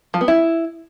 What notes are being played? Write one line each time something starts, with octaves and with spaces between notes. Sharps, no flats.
F3
B3
E4